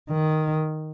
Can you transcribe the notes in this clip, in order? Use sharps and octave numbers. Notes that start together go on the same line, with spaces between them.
D#3